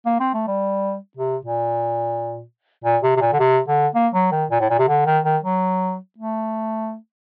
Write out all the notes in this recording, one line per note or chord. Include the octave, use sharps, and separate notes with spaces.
A#3
C4
A3
G3
C3
A#2
A#2
C3
C3
A#2
D3
C3
D3
A#3
F#3
D#3
A#2
A2
A#2
C3
D3
D#3
D#3
F#3
A3